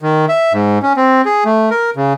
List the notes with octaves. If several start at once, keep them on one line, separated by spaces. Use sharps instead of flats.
D#3
E5
G#2
C#4
C4
G#4
A3
A#4
C#3